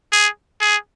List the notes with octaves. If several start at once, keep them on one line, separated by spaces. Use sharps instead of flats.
G#4
G#4